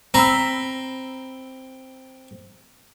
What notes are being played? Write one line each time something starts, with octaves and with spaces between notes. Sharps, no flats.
C4 A#5 B5 E6